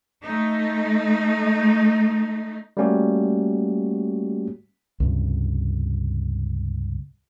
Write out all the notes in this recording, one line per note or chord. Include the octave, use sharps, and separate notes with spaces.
A3 D#4
G3 A3 A#3 C#4 F#4 G4
C#2 G2 C3